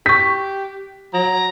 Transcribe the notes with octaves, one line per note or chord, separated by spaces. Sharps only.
G4 C#6 G6 B6
F#3 A#5